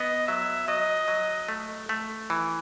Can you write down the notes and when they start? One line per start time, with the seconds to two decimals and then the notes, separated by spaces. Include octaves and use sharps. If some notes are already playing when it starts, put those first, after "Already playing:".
Already playing: B3 D#5
0.27 F#3 E5
0.68 F#3 D#5
1.08 F#3
1.49 A3
1.89 A3
2.30 E3